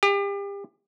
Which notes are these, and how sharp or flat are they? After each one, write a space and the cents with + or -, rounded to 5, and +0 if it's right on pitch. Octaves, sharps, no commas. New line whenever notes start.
G4 +35